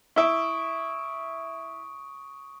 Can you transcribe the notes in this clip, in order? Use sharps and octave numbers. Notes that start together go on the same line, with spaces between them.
E4 E5 C#6 D#6 D7